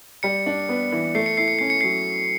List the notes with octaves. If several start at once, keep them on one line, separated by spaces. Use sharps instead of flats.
G3 C#7
D4
B3
E3
A3 C7
C#7
E4 C7
C#7
C#4 C7
C#7
F#3 C7